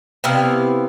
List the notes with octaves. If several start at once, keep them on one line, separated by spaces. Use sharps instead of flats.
C3 B3 E4 F5